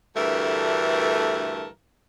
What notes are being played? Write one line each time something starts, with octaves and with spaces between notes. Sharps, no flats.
D2 G2 E3 A3 A4 A#4